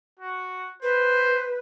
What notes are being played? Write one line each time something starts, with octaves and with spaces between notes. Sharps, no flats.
F#4
B4 C5